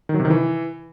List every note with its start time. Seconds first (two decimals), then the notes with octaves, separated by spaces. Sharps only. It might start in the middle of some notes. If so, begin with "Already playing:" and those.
0.09 D#3
0.14 F#3
0.20 C3
0.25 D#3
0.30 E3